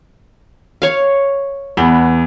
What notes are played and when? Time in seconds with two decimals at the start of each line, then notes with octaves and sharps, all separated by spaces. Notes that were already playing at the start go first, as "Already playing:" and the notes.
0.82 C#5 F5
1.77 E2 B3